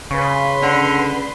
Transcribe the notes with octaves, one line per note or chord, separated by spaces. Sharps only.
C#3 B4 C6 C#6
D3 C#4 D5 F#5